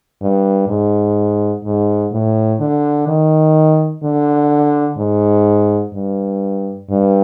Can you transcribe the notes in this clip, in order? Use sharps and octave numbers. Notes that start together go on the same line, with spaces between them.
G2
G#2
G#2
A2
D3
D#3
D3
G#2
G2
G2